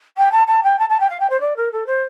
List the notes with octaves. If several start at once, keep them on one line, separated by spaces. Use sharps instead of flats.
G5
A5
A5
G5
A5
A5
G5
F5
G5
C5
D5
A#4
A4
C5